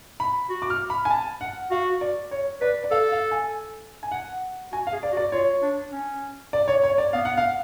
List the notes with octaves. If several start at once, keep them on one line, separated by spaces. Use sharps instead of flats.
B5
F#4
D6
F6
B5
G#5
A5
F#5
F#4 F5
D5
C#5
B4 D5
D5
A4 F5
F5
G#5
G#5
F#5
F#4 G#5
F5
G#4
D5
F#4
D5
F4 C#5
D4
C#4
D5
C#5
C#5
D5
B3 F5
F#5
F5